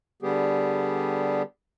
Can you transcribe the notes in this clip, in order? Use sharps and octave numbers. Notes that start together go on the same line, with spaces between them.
D3 G3 B3 G4 G#4